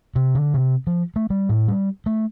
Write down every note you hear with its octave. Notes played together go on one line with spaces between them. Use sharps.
C3
D3
C3
F3
A3
G3
A2
G3
A3